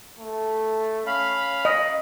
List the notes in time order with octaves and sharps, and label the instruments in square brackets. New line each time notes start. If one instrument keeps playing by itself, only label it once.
[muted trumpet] A3
[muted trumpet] C#4 [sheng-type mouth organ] F5 B5
[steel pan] D#5